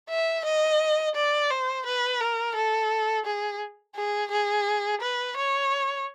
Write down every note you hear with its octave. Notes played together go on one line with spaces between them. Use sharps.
E5
D#5
D5
C5
B4
A#4
A4
G#4
G#4
G#4
B4
C#5